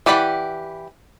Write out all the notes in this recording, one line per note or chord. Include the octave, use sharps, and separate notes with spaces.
E3 G4 D5 F#5 B5